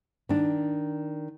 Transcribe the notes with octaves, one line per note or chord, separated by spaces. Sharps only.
D#3 D4